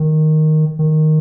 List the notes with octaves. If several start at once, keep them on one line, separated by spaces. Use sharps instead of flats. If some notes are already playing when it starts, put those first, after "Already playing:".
Already playing: D#3
D#3